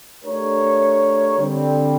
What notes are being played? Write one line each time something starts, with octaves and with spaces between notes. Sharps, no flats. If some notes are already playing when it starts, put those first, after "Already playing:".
A3 D4 G4 A#4 C#5
D3 G3 C4